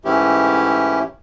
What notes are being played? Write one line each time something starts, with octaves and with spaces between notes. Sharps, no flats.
G#2 E3 A3 C#4 E4 G4